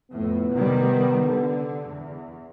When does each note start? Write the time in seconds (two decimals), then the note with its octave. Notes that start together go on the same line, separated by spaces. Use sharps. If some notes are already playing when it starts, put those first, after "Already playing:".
0.11 F2 A2 B3
0.52 C3 D#3 G3
1.25 D3
1.89 E2